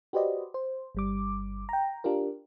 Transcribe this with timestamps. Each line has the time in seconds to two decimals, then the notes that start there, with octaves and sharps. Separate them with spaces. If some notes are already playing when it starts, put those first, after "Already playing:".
0.13 F#4 G4 B4 C5 D5 D#5
0.54 C5
0.95 G1 G3 D6
1.69 G5 A#5
2.04 D4 F4 G4 A#4